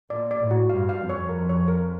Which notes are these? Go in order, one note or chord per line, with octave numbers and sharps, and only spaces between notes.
A#2 D5
D5
A2
F#4
G2 F5
F5
F2
C#5
A#4
C#5
A#4